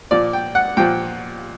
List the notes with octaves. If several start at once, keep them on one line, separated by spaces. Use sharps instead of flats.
A#2 F3 D5
G5
F#5
A#2 F3 G5